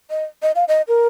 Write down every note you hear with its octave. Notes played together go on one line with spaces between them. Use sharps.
D#5
D#5
F5
D#5
A#4